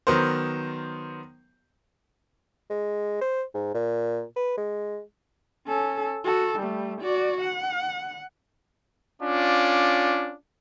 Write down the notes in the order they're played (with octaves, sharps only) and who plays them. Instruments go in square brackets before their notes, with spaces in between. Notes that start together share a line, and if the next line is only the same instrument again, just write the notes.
[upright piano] D#3 F#3 B3 A#4 C5
[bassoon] G#3
C5
G#2
A#2
B4
G#3
[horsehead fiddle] C#4 A4
F#4 A4
G3 A3
F#4 D5
F#5
[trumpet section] C#4 D4 F4 D6